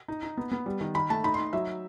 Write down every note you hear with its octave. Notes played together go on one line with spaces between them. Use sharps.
D#4
D#4
B3
B3
G3
D#3
D#3 B5
A3 A5
D#4 B5
C6
D#4
F#3 E5